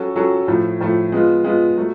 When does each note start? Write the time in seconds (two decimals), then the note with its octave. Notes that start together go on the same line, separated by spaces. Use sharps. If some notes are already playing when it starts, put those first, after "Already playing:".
Already playing: F#3 C#4 F#4 A4
0.16 F#3 C#4 F#4 A4
0.48 A2 F3 A3
0.81 A2 F3 A3
1.12 G#3 B3 F4
1.44 G#3 B3 F4
1.77 F#3 A3